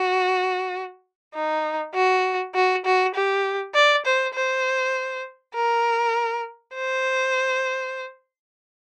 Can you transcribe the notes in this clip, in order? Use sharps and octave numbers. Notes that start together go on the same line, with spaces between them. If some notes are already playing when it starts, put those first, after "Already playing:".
Already playing: F#4
D#4
F#4
F#4
F#4
G4
D5
C5
C5
A#4
C5